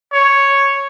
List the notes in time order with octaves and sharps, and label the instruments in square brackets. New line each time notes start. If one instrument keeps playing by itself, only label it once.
[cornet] C#5